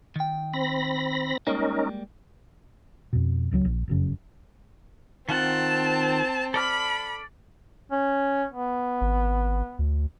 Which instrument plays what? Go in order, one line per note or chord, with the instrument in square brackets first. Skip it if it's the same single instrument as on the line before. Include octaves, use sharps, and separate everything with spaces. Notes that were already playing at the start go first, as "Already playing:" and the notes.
[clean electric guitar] D#3 G5
[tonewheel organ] C4 B5 A#6
[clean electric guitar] G3 G#3 A#3 [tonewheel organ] C#4 D#4 A#4
[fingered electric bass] F2 B2
D1 C#2 F3 F#3
A#1
F1 F#2 C#3
[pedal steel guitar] D#3 F4 F#5 [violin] C4 [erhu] A5
[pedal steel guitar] A4 D5 F6 [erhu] B5
[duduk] C#4
B3
[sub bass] G#1
D2